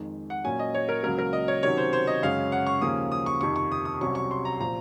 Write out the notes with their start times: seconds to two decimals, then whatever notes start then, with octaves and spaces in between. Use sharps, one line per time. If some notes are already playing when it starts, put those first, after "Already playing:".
Already playing: F2 D#3 G#3
0.30 F#5
0.44 A#2 F#3 A#3 C#4 G#5
0.59 D#5
0.75 C#5
0.89 A#4
1.03 C#2 C#3 F#3 A#3 A#4
1.19 A#4
1.33 D#5
1.48 C#5
1.63 C3 D#3 F#3 C#4 C#5
1.77 C5
1.93 C5
2.07 D#5
2.22 F#2 C#3 G#3 C#4 F5
2.52 F#5
2.67 C#6
2.81 D#2 C#3 F3 A#3 C#4 D#6
3.12 D#6
3.26 C#6
3.41 F2 C3 D#3 C#6
3.56 C#6
3.72 D#6
3.85 D#6
4.01 C2 C3 F#3 C#4 C#6
4.15 C#6
4.31 C6
4.45 A#5
4.60 A#2 F3 C4 A#5